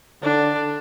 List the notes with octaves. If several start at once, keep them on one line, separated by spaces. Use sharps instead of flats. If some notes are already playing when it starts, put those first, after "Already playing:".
D3 D4